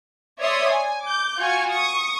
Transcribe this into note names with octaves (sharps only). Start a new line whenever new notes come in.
C#5 D5 E5 C6 D#6
G#5
D6 G6
F4 F#4 G#5 C#6
C#6 D#6